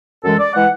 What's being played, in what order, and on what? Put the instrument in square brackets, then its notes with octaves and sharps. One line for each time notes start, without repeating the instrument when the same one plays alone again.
[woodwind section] F#2 E3 G#3 A4
D5
E3 G#3 F#5